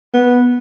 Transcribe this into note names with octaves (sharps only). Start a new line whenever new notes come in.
B3